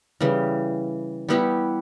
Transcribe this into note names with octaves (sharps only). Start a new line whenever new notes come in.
C#3 E3 G3
G3 B3 E4 G4